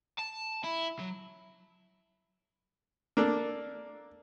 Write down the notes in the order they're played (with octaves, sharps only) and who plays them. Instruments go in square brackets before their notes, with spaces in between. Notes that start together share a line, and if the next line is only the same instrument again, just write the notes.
[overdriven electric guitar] A5
E4
F#3
[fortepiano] A#3 D4 A4